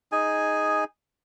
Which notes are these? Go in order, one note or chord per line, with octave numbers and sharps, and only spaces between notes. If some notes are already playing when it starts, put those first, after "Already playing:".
D#4 G#4 G#5